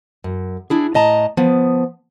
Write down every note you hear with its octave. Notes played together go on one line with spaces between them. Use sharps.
F#2
D4 E4 G#4
A2 D#5 A5 A#5
F3 B3